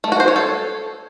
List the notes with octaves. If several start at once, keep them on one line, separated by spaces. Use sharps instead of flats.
A3
F#4
C5
C#5
A4